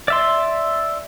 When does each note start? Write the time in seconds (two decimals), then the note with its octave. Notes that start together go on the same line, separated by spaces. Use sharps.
0.08 D5 E5 C6